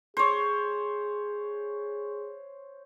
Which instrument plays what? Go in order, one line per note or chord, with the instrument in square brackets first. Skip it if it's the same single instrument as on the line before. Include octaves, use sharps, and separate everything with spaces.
[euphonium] G#4 [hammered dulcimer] C5 C#5